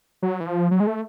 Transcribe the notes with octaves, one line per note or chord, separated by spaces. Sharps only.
F#3
E3
F3
F#3
G#3
A3